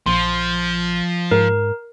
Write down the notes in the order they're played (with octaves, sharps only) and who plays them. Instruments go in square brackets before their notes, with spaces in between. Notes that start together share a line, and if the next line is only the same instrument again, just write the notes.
[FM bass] A#1 [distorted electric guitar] F3 [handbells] C6
[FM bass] G#2 [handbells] A#4